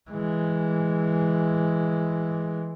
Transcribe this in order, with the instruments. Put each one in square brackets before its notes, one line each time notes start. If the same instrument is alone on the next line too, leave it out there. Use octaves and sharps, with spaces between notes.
[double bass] E3 G#3